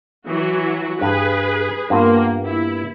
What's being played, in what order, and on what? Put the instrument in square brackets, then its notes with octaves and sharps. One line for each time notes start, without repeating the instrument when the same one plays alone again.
[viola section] E3 F#3 F#4
[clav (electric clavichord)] G2 [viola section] G#4 B4
[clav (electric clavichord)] G2 B3 F4 [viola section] A#3
[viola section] E4